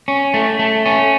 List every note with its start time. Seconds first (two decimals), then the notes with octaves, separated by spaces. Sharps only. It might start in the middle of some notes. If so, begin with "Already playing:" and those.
0.08 C#4
0.34 A3
0.59 A3
0.86 C#4